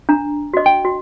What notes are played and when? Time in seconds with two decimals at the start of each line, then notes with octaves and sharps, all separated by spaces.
0.09 D4 A#5
0.54 F#4 D#5
0.66 G5
0.85 F#4